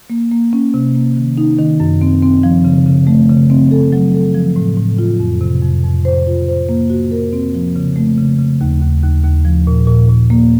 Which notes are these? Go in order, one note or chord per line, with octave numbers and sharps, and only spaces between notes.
A#3
A#3
C#4
C3
A#3
D#3
D#4
D#3
F#2
C4
C4
F3
C#3
C#3
A3
C#3
C4
A4
F#3
A4
F3
A2
A2
F4
F2
C3
F2
F2
C5
F4
C5
A#3
F#4
A#4
C4
F3
C#3
A3
C#3
C#3
D#2
D#2
D#2
D#2
F3
A#2
A#2
A#2
A#3